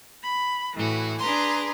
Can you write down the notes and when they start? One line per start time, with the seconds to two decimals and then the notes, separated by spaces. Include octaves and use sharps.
0.21 B5
0.74 A2 E3 F#4
1.20 D4 G#4 B4 A#5 C6